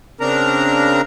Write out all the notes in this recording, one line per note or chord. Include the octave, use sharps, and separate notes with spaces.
C#3 C4 D4 A#4 A#5